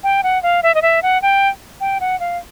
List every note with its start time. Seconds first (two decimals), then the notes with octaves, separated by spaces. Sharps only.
0.04 G5
0.23 F#5
0.43 F5
0.63 E5
0.75 D#5
0.82 E5
1.03 F#5
1.22 G5
1.81 G5
2.00 F#5
2.20 F5